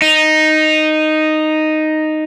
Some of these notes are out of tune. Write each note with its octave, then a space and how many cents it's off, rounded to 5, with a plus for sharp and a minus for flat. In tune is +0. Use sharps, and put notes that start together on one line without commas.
D#4 -5